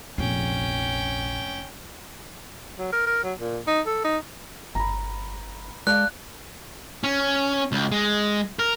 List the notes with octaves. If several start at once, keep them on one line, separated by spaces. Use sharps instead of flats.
F1 A#1 F2 C#4 G5
F#3
A#4
A#4
F#3
A#2
D#4
A4
D#4
G1 A#5 B5
G#3 D5 F5 A5 F#6
C#4
C#2
G#3
A#4